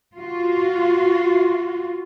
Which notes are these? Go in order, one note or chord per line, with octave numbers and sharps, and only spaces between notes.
F4 F#4